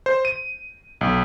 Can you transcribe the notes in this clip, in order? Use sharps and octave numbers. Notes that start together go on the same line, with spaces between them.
C5
D#7
B1